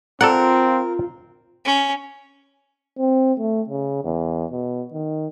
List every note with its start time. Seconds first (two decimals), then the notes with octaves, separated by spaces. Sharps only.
0.21 C4 F4 A4 A#4 D5 F#5
1.65 C#4
2.99 C4
3.40 A3
3.69 C#3
4.04 E2
4.52 B2
4.93 D#3